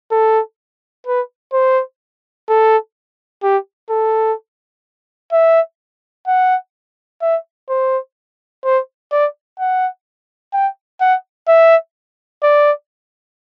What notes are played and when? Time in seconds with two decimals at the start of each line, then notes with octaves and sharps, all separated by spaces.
0.11 A4
1.07 B4
1.53 C5
2.49 A4
3.43 G4
3.90 A4
5.32 E5
6.27 F#5
7.22 E5
7.69 C5
8.65 C5
9.12 D5
9.59 F#5
10.53 G5
11.01 F#5
11.48 E5
12.43 D5